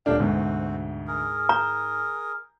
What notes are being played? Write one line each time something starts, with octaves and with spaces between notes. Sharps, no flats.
D#1 A3 D4 F5 G5
D2 G#2 B2 C4 F#4
G#4 A#4
A#5 G6 G7